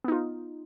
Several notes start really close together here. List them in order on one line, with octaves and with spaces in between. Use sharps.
B3 D#4 F4